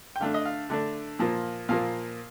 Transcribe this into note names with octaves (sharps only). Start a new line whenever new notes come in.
G5
D3 A3 D4 F5
D#5
F5
D3 A3 D4
A#2 F3 A#3
A#2 F3 A#3 F5